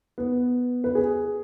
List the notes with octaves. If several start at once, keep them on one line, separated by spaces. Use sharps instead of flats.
B3
B4
G#4